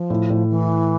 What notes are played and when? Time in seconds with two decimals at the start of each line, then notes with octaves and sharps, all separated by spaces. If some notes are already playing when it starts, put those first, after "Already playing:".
Already playing: F3
0.10 A2
0.30 A2
0.50 E3